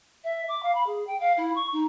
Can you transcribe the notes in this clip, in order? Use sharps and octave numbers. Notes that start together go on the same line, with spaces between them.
E5
D6
F5
B5
G#4
G5
F5
E4
C#6
D#4